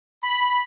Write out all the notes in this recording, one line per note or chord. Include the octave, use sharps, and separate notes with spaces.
B5